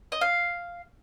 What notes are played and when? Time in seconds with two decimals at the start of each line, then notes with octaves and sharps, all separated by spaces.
0.12 D#5
0.21 F5